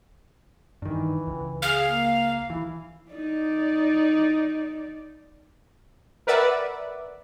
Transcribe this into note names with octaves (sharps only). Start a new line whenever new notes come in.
G2 D#3 E3
C#2
G#4 F5
A#3
E3 E4
D#4 D5
A#4 B4 D5 E5 F#5